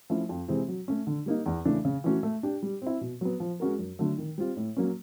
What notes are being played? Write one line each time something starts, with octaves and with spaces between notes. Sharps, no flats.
F3 A3 C#4 E4
F2
C3 E3 G#3 C4
F#3
A3 C#4
D3
G3 A#3 D#4
E2
C#3 E3 A3 D4
C#3
E3 A3 C#4 F#4
A3
D4 G4
G3
C4 E4
B2
F#3 B3
F3
G#3 C#4 F#4 A#4
F#2
D3 F#3 A3
D#3
G3 C4 F4
A2
F#3 A#3 C#4